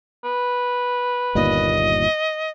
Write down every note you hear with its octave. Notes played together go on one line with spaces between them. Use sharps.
B4
G1 D#2 A#2 D#5